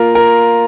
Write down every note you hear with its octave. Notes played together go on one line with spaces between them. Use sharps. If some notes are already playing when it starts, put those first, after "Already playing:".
Already playing: A#3 F4 A#4
A#4